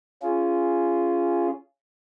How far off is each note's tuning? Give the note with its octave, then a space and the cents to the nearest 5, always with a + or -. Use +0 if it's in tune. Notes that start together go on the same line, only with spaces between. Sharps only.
C#4 +0 F4 -15 G#4 +0